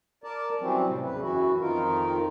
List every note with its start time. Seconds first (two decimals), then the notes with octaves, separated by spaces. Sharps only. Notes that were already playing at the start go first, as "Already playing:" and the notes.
0.24 A#4 D5 A5
0.61 E3 F#3 G3 C4 C#4
0.86 A2 C3 G3
1.04 E2 C#3 B4
1.21 F#2 E3 E4 F#4
1.61 F2 D#3 D#4 F4 A#4